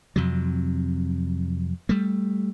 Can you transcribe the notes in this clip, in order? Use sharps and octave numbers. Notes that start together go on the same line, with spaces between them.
F2 C3 F#3
G3 A3